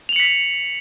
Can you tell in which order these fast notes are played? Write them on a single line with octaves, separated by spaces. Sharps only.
F7 F#7 C#7 B6